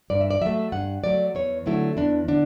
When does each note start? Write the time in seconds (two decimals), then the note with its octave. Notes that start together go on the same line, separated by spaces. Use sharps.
0.10 G2 D5
0.21 E5
0.31 D5
0.42 F#3 A3 E5
0.72 G2 F#5
1.04 F#3 A3 D5
1.35 E2 C#5
1.66 D3 F#3 A3 E4
1.97 E2 D4
2.28 D3 D4